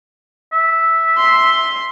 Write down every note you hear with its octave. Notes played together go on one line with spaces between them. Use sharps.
E5
C6